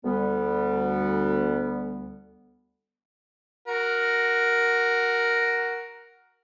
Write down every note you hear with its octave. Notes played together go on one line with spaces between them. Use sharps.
D2 G3 B3
F#4 A#4